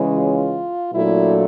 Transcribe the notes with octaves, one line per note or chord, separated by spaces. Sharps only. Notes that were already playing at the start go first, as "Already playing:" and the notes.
Already playing: C#3 E3 G#3 C#4
F4
A#2 F#3 A3 D4 E4